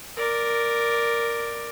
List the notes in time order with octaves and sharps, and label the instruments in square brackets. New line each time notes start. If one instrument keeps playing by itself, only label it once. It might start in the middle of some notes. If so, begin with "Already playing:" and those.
[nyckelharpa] A#4 D5